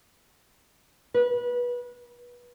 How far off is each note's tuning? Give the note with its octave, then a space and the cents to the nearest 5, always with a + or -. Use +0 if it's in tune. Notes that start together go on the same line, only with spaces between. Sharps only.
B4 -25